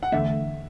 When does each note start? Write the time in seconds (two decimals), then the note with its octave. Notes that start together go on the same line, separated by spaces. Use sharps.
0.03 F#5
0.12 E2 D3 A3 E5